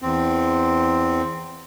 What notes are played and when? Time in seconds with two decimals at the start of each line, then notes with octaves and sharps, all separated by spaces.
0.02 E2 C4